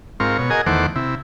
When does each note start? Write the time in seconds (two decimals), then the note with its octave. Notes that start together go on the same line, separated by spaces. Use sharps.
0.20 G#2 C4 F4 A#4 C#6
0.38 B2 C#5
0.50 F#4 G#4 A#4 D#5 G#5
0.66 E2 D#3 A3 C5 F#5 D6
0.95 C3 E4